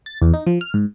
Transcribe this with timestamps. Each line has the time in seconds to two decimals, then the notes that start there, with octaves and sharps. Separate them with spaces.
0.06 A6
0.22 E2
0.34 D#4
0.47 F3
0.61 F6
0.74 G#2